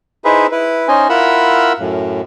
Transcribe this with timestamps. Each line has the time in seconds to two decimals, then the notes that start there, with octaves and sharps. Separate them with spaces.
0.25 D#4 E4 G#4 B4 C5 E5
0.52 E4 B4
0.88 C#4 D#4 C5 D#5 G#5
1.09 E4 F4 A#4 F#5 B5 E6
1.79 F#2 A2